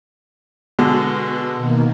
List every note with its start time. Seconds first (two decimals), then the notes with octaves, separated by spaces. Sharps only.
0.79 B2 D3 G#3 B3 F#4
1.56 B2 D#3 A#3